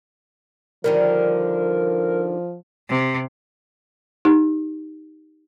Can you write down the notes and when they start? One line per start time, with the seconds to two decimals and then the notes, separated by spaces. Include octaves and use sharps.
0.84 D3 D#3 F3 G3 A#4
2.89 C3
4.25 D#4 G4